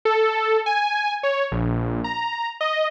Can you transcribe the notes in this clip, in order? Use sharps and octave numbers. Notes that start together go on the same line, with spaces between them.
A4
G#5
C#5
A#1
A#5
D#5